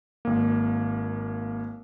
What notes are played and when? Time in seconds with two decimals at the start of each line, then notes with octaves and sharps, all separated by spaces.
0.25 G#1 A#3